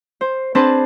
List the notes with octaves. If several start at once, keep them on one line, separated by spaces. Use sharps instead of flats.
C5
C4 D4 G#4 B4 C5 A5